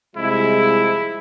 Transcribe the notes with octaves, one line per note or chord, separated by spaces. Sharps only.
C2 F3 G#3 E4